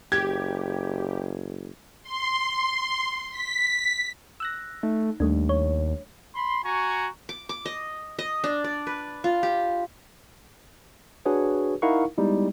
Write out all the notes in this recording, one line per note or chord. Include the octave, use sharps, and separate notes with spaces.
F#1 G4 G#6
C6
B6
E6 F#6 A#6
A3 D#4
D#2 G3 A3 D4
C#5
B5 C6
F#4 G#5 A#5 C#6
D6
D6
D#5
D#5
D4
D5
B4
F4
G4
D4 F#4 G#4 B4 C#5
D#4 E4 A#4 F5 F#5 C#6
G3 G#3 B3 D#4 E4